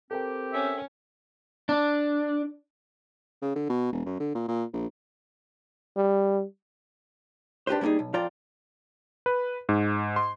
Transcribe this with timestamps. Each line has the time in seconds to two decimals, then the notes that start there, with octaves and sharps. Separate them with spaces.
0.11 C4 G4 A4 A#4 G5
0.53 C#4 E5
1.69 D4
3.42 C#3
3.56 D3
3.69 B2
3.92 E1
4.06 F#2
4.20 D3
4.35 A#2
4.48 A#2
4.73 A#1
5.96 G3
7.67 D4 G4 B4 C5
7.81 G3 A#3 C4 D#4 G#4
7.99 B1
8.14 F2 F4 C5 D5 G5 A#5
9.26 B4
9.69 G#2
10.16 C6